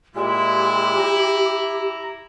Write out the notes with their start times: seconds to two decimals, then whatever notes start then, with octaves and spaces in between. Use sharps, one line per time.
0.15 A#2 G#3 E4 G4
0.99 A#5